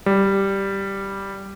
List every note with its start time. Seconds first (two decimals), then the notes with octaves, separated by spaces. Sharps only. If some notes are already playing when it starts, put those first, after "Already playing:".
0.06 G3